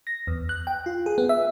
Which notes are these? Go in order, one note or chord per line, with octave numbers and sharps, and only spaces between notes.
A#6
E2
F#6
G5
F4
G#4
B3
E5